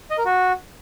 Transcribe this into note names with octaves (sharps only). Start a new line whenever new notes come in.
D#5
A#4
F#4